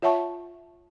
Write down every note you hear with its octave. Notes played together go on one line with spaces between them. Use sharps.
F4 C#5 E5 F#5 A5 C#6